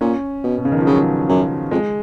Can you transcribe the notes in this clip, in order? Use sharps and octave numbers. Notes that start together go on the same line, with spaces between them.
A#2 C#4
B2
B2
C#3
D#3
F3
C#3 F#3
F#2
F2 G#3